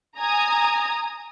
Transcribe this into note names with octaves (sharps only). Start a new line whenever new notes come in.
G#5 A#5 D#6